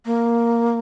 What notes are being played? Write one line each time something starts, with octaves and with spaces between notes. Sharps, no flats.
A#3